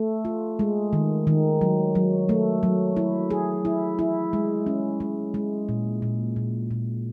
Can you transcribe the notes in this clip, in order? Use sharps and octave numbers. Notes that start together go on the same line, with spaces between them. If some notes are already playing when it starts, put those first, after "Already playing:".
Already playing: A3
F4
G#3
D#3
D#3
F#3
F#3
A3
F#3
E4
G#4
E4
E4
G#3
C#4
G#3
G#3
A#2
A#2
A#2
A#2